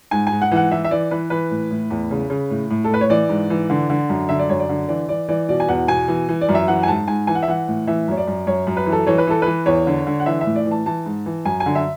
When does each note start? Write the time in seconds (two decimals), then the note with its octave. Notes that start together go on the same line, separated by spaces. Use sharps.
0.11 G#2 G#5
0.27 G#5
0.32 G#2
0.42 F#5
0.52 E3 F#5
0.71 E3 E5
0.84 E5
0.91 E3 D5
1.11 E3 B4
1.30 E3 B4
1.51 A2
1.71 A2
1.90 E2
2.11 C#3
2.30 C#3
2.50 A2
2.70 A2
2.84 A4
2.90 A2 B4
3.01 C#5
3.10 E3 D5
3.29 G#2
3.50 E3
3.70 D3
3.90 D3
4.09 F#2
4.29 D3 E5
4.39 D5
4.49 F#2 C#5
4.60 D5
4.69 D3
4.88 E3 D5
5.09 E3 D5
5.29 E3 D5
5.49 B2 D5
5.60 G#5
5.68 E2 F#5
5.88 B2 G#5
6.08 E3
6.29 E3
6.41 D5
6.49 F#2
6.55 E5
6.68 E3 F#5
6.83 G#5
6.88 G#2 A5
7.08 G#2 G#5
7.27 E3 G#5
7.35 F#5
7.42 E5
7.48 E3 F#5
7.68 A2
7.87 E3 E5
8.08 F#2 C#5
8.17 D5
8.27 F#2
8.47 F#2 C#5
8.67 F#2
8.77 B4
8.86 E3
8.92 A4
9.07 E3 C#5
9.18 B4
9.27 E3 A4
9.42 E3 B4
9.66 E2 C#5
9.87 D3
10.07 D3
10.20 F#5
10.26 E3 E5
10.41 E5
10.46 A2
10.56 D5
10.66 E3
10.71 A5
10.86 E3 A5
11.06 G#2
11.26 E3
11.45 F#2 G#5
11.60 G#5
11.66 D3
11.75 E5